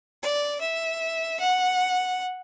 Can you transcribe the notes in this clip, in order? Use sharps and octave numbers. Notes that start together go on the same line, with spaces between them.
D5
E5
F#5